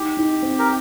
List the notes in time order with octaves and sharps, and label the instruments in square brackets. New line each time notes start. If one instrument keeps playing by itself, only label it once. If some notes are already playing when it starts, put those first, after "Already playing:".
Already playing: [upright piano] D#4 [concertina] G4
[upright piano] D#4
C4
[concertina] A#4